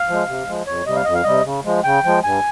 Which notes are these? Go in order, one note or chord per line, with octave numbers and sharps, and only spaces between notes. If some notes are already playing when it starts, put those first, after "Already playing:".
Already playing: F5
F3 G#3
C3
F3 G#3
F2 C#5
C3 G3 D#5
F5
F2 D#5
F5
C3 G3 D#5
C#3
F3 G#3
C#3 G5
F3 G#3
G2 G#5